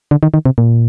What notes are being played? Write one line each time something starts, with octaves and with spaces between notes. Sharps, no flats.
D3
D#3
D#3
C3
A#2